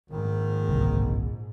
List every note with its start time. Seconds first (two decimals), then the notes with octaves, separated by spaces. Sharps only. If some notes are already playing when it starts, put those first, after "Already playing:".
0.11 A#1 G#2 D#3
0.69 G1 C2 C3